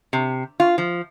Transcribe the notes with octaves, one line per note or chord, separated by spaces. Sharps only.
C3
F4
F3